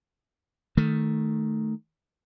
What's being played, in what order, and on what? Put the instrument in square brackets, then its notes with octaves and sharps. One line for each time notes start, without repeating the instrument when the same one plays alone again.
[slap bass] D#3 A3